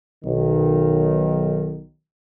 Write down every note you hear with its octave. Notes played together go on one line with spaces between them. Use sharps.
B1 D#3